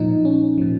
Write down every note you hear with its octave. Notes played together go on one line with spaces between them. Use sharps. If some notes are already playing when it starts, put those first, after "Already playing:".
Already playing: A#2 F3 D#4
C#4
A#2 F3